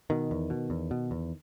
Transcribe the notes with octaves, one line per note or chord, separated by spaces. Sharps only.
B2 D#3
E2
B2
E2
B2
E2